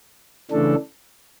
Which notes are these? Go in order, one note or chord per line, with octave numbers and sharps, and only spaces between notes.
C#3 E3 A3 D4 A4